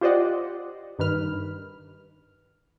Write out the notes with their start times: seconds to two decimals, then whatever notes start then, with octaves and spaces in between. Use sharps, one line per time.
0.01 F4 G4 C5 D5 D#5 F#5
0.99 G2 D#3 B4 F6